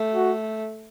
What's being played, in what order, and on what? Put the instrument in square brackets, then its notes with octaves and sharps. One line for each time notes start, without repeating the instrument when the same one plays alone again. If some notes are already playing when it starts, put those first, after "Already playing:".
Already playing: [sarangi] A3
[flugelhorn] F#4